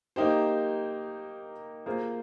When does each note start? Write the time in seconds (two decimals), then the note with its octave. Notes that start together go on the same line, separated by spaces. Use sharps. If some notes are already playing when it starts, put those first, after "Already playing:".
0.16 A#3 D#4 G4 C5
1.86 A#3 F4 G#4 C5